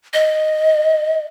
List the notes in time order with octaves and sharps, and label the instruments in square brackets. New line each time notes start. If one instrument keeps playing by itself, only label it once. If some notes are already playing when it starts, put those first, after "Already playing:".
[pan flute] D#5